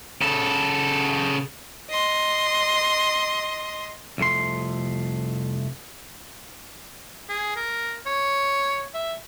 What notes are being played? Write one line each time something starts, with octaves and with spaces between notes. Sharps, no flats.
C#3 A4
D#5 C6
C2 F2 A3 C6
G#4
A#4
C#5
E5